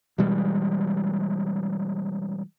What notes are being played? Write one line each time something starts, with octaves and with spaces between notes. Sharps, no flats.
B2 E3 G3 G#3